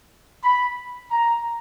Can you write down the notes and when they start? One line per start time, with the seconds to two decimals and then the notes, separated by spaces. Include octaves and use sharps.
0.44 B5
1.10 A#5